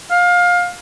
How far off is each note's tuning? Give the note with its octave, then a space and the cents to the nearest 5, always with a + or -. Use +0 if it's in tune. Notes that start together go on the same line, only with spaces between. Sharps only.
F5 +25